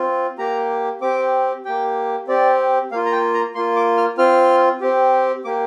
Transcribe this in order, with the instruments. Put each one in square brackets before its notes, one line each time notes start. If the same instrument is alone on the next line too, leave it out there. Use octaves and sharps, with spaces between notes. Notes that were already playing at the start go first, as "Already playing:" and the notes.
Already playing: [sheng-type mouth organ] C4 F4
A#3 G4 A#5
C4 G4 D6
A#3 G4 G5
C4 G4 D5
A#3 F4 F5
A#5
G5
A#5
A#3 F4 C6
D6
F6
C4 F4 F6
C4 G4
A#3 G4 D6